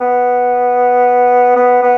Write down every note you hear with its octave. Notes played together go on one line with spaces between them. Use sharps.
B3
B3
B3